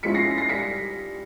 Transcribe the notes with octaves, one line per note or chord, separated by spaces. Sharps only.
F3 G#3 C#4 E4 B6 C#7
A#6 C7
A#6 C7
G3 B6 C#7